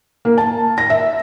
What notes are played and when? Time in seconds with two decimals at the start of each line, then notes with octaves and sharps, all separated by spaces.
0.25 A#3
0.38 A5
0.78 A#6
0.90 E5